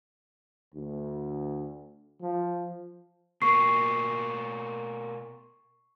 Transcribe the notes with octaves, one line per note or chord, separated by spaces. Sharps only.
D2
F3
B2 A#3 C#6 C7